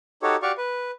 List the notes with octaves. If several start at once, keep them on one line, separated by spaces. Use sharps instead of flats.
D#4 F#4 G4 A4 C#5
F#4 G4 D5 F5 C#6
B4